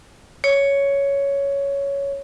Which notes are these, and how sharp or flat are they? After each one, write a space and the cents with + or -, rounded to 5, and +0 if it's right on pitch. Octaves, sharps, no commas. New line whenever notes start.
C#5 +10